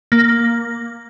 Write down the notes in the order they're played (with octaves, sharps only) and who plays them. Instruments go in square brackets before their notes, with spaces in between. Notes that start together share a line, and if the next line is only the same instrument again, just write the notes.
[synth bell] A#3